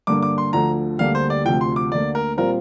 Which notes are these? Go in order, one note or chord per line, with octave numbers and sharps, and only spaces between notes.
G2 D3 A#3 D4 D6
D6
C6
D2 D3 F3 A#5
D2 D3 G3 A#3 G4 F5
C5
D5
D2 C3 F3 G5
C6
D6
D2 D3 A#3 D5
A#4
A#2 G3 C4 F4 A#4 C5